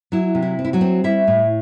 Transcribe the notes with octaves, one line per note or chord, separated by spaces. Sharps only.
F#3 E4
C3
E4
C4
E4
F#3 F#4
C4
G3 E4 E5
A2